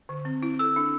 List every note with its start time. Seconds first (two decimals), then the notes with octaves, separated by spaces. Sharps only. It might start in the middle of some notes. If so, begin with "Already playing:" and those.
0.09 D3
0.25 C4
0.43 E4
0.59 A4 E6
0.76 D4